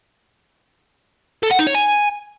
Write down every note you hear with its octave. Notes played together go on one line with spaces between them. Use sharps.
A4
F#5
D#4
C#5
G#5